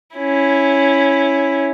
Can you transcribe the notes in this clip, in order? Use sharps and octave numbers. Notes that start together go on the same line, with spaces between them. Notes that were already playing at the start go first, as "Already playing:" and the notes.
C#4 E4